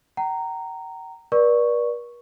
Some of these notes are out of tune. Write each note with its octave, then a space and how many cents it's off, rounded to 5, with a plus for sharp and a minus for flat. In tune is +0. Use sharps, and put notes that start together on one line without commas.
G5 -45 A#5 -10
B4 -45 D5 +5 C#6 +0